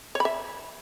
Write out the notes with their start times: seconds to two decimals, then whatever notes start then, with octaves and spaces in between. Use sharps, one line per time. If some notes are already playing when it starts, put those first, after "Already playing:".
0.15 C#5
0.20 B5
0.25 E5